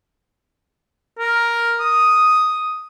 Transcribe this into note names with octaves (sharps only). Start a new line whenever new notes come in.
A#4
D#6